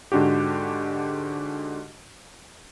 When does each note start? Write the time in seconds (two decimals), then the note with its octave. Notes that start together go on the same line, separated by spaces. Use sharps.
0.12 G#2 D3 D4 F#4 G4